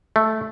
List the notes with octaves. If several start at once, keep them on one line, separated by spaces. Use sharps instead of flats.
A3